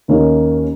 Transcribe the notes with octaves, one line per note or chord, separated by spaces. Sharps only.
D#2 D#3 A#3 C#4